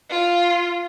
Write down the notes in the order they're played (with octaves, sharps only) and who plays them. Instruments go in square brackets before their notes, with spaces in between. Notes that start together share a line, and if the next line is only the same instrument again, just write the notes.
[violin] F4